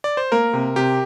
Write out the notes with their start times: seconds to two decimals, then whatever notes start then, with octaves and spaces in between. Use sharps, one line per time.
0.04 D5
0.17 C5
0.32 A#3 A#4
0.53 C3
0.76 C3 G4